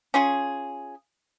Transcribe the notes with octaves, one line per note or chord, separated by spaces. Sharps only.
C#4 F4 G#4